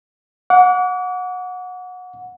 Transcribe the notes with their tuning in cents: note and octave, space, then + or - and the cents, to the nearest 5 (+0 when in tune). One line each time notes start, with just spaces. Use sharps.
F#5 -20 D6 -45